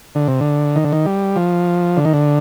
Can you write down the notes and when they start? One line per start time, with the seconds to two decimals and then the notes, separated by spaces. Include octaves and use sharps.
0.15 D3
0.28 C3
0.41 D3
0.76 D#3
0.84 D3
0.92 D#3
1.06 G3
1.36 F3
1.97 D3
2.05 D#3
2.14 D3